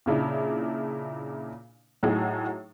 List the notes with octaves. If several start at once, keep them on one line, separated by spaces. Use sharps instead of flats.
A#2 C#3 D4 E4
A2 F#3 D#4 F#4 G#4